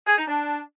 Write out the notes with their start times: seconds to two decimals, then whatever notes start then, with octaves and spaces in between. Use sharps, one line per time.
0.07 G#4
0.17 D#4
0.27 D4